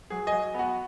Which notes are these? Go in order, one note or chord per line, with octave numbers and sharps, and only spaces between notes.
F#3 G#4
F#3 D#5 G#5
B3 F#4